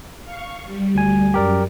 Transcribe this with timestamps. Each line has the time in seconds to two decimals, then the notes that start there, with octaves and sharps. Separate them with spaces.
0.22 F5 C#6
0.65 G3
0.95 D2 G#5
1.34 F#2 G4 A#4 D5